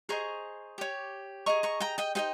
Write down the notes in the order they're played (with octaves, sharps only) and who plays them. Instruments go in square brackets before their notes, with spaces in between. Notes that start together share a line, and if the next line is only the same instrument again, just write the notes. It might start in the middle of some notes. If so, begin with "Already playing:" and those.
[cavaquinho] G#4 C5 D#5 A#5 C#6
G4 C#5
G#4 D#5 A#5 C#6
A#5 C#6
G5 A#5
D#5 G5
D#4 G#4 C5 D#5 G5